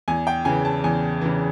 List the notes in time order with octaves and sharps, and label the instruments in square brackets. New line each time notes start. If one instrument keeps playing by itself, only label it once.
[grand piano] E2 G#5
G5
C#3 E3 G#5
A5
E2 G#5
C#3 E3